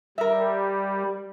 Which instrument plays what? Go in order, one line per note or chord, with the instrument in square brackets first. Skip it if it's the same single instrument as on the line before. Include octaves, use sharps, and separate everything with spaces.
[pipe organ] G3 [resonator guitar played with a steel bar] A#4 E5